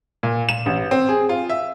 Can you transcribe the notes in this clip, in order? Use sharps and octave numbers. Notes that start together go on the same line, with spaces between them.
A#2
E7
A1
C4
G#4
F4
E5